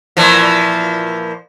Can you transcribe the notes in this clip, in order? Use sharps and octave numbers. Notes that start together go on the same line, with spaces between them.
A#2 E3 F3